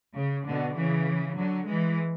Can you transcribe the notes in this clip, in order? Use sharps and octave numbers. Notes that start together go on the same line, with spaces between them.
C#3
B2 D3
C#3 E3
D3 F#3
E3 G#3